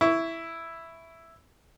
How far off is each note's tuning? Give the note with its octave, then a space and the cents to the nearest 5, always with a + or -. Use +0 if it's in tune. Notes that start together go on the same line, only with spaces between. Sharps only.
E4 +0 C#6 +15